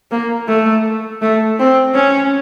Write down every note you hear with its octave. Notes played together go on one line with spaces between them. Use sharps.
A#3
A3
A3
C4
C#4